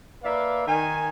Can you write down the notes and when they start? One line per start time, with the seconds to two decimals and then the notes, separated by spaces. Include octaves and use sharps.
0.24 A#3 B4 D5 E5 F5
0.67 D#3 G#5